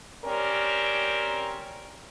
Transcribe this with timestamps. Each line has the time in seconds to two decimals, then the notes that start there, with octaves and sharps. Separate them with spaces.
0.24 C4 C#4 G4 A#4 D5